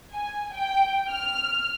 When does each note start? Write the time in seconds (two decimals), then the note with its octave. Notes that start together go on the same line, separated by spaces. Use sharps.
0.11 G#5
0.52 G5
1.09 F6